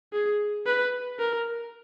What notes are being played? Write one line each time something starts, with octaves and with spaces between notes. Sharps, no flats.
G#4
B4
A#4